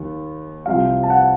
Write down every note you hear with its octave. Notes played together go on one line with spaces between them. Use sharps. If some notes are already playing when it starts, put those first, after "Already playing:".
Already playing: D#2 D#3
C2 C3 F3 F5
A5
F#5